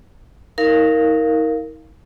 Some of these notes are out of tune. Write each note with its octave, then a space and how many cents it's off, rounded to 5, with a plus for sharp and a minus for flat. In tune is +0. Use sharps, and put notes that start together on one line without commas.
D#4 +40 A#4 -5 F5 -10